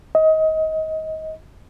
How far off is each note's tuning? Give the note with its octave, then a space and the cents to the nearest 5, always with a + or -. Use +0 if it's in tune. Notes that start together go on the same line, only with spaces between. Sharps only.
D#5 +25